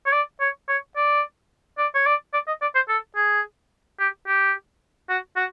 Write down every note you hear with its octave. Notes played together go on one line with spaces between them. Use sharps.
C#5
D5
C#5
C#5
D5
D5
C#5
D5
D5
D#5
D5
C5
A4
G#4
G4
G4
F#4
F#4